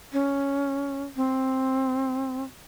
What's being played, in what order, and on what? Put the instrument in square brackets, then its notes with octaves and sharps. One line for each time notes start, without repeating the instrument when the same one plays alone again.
[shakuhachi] C#4
C4